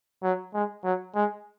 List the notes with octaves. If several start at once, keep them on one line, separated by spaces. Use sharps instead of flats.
F#3
G#3
F#3
G#3